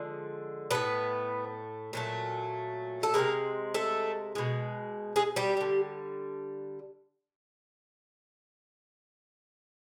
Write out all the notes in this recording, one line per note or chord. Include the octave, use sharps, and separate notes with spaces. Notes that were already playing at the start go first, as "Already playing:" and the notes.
Already playing: D3 F3 G#3
A2 F#3 A3 B3 B4
A#2 F#3 A3
A4
C3 F3 G#3 A#3 A#4
A3 A4
B2 G#3
G#3 G#4
G3 G4
D3 G3